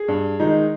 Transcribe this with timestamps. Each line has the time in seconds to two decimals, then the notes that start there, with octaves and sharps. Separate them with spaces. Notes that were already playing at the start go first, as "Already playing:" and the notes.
Already playing: G#4
0.08 G2
0.40 D#3 G#3 D#4